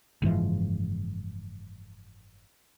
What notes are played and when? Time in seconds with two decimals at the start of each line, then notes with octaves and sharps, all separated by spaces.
0.22 F#1 G#2 E3 F3